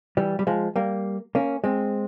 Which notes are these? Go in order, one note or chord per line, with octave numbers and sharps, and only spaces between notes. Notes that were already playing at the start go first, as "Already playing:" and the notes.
E3 G3
G3
F3 G#3
G3 A#3
A#3 C#4
G#3 C4